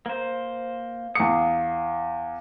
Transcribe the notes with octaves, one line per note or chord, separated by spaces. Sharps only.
A#3 C5
E2 F5 D6 D#6 C#7